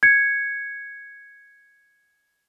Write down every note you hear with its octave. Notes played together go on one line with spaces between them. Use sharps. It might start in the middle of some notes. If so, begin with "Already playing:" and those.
G#6 C#7